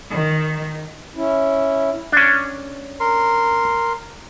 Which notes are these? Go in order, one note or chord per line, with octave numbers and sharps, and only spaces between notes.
D#3
C#4 E4
C#4 D4
A#4 C6